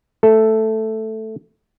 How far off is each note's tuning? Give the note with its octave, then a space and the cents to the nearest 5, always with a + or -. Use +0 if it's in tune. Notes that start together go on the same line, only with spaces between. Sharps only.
A3 +0 A4 +0